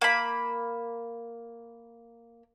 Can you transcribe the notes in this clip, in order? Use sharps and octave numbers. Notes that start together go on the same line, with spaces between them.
A#3 B5